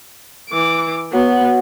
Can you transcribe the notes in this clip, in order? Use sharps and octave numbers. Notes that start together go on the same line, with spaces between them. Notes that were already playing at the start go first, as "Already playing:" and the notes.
E3 D6
F#3 B3